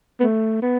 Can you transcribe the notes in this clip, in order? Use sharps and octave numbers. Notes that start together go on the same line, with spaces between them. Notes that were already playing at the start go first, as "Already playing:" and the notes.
B3
A3
B3